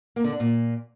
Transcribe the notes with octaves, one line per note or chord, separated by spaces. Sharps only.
A#3
D3
D4
A#2